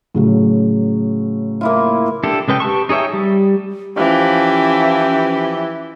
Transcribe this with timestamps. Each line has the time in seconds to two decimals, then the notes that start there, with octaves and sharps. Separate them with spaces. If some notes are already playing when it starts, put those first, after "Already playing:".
0.15 A2 C#3 F#3
1.61 A#3 E4 F4
2.23 D4 E4 G4 A4
2.48 C#3 G#3 B4 G5
2.60 G4 B4 A5 C#6
2.89 D#4 G#4 C#5 E5 G5
3.13 G3
3.97 E3 F3 C#4 G4